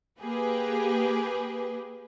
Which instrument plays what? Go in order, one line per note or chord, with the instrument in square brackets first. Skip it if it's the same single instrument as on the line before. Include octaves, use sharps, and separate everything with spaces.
[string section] A#3 G4 G#4 B4